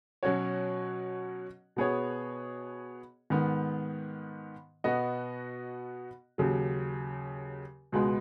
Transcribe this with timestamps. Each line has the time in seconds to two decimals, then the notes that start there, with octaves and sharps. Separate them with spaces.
0.23 B2 F#3 C#4 F#4 C#5
1.76 B2 B3 G#4 C#5
3.30 G#2 D#3 B3
4.84 B2 B3 F#4 D#5
6.38 D#2 C#3 F#3
7.92 C#2 B2 G#3 B3